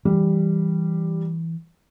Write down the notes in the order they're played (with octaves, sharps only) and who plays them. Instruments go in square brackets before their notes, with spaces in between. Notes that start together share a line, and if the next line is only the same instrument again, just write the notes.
[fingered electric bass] E3 [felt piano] G3